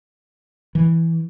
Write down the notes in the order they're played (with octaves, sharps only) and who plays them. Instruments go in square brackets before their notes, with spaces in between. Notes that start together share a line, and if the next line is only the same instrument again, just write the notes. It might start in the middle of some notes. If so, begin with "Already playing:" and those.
[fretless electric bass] E3